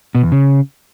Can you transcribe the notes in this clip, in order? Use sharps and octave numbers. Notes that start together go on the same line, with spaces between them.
B2
E2
C#3